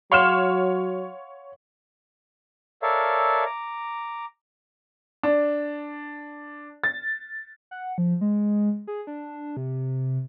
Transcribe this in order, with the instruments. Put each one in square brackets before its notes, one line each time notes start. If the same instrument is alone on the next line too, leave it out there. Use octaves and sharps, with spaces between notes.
[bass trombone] F#3 [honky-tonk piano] C#5 F6 E7 [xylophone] F5 F#5 C6
[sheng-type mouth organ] A4 A#4 C#5 D5 E5 F5
A#5 D6
[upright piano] D4
A6
[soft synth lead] F#5
F3
G#3
G#4
D4
C3